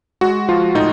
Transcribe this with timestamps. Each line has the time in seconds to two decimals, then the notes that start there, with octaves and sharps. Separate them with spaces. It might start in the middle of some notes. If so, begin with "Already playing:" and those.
0.21 G#3 F#4
0.48 F3 F4
0.75 A2 D#4